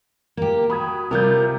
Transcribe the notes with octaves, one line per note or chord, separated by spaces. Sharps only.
A#3 G4
F#4 B5 D#6 G#6
C3 G3 F4 A#4 G6